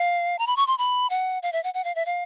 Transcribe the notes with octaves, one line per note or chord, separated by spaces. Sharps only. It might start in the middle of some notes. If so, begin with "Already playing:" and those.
Already playing: F5
A#5
B5
C#6
C6
B5
F#5
F5
E5
F#5
F#5
F5
E5
F5